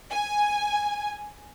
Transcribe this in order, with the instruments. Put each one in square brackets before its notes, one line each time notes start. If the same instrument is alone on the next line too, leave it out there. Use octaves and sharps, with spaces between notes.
[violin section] G#5